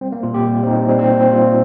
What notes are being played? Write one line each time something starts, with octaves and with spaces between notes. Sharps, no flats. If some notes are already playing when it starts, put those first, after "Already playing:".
G3 C4
A#3
A#2 F4
G4
G3
C4
A#2 D#4
G3 C4
C4
A#2
C4
G3 F4